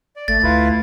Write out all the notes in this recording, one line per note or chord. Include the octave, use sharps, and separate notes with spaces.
D5
G#1 A3 A6
D2 E4 F4 B4